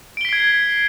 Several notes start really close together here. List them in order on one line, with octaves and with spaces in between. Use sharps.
D7 G7 B6 C7 G#6